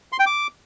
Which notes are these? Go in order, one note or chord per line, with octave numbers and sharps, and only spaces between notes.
C6
G5
D6